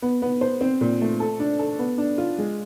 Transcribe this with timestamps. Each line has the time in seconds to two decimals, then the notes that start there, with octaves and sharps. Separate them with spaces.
0.02 B3
0.22 B3
0.41 C5
0.61 C4
0.81 A#2
1.01 A3
1.20 A4
1.40 D4
1.59 A4
1.79 B3
1.98 D4
2.18 F4
2.38 G#3